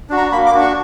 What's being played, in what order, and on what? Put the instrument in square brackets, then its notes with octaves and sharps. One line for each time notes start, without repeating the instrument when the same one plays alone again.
[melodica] D4 F#4
A#5
A#3 B5
D6
D4 F#4
C#6